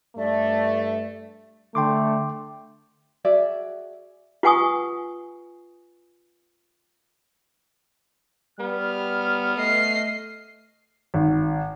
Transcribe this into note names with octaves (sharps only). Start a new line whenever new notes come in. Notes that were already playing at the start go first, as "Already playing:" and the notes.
G2 A3 D5 E5
D3 A3 G5 C6 D6
F#4 G#4 D5 E5
F4 B4 F#5 G#5 C#6 D#6
G3 B3 F6
A3 D#5 C7
G#1